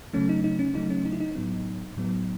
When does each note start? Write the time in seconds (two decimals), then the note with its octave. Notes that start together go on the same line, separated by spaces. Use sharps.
0.13 C#3 F#3 A3 C#4
0.29 D#4
0.44 D#4
0.59 C#4
0.74 C#3 F#3 A3 D#4
0.90 C#4
1.05 D#4
1.13 E4
1.20 D#4
1.35 A2 F#3 B3
1.97 A2 F#3 B3